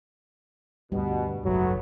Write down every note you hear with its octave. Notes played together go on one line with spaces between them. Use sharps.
D2 G2 B2 G3
F#1 B1 G#2 F#3 A3 B3 F#4